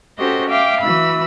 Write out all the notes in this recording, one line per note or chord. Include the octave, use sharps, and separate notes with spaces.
C#4 F#4 G4 A4 C5 D#5
E5 F5 G5 D6
E3 F#4 B5 E6